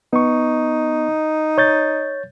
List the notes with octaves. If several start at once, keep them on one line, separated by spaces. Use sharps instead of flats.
B3 D#4 C#6
C#5 G6 A6